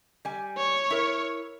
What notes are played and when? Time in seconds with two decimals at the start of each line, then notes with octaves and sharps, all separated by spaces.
0.25 G3 G#5
0.57 C#5
0.90 E4 A#4